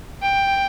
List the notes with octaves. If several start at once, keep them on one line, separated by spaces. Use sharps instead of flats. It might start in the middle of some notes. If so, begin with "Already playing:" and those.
G5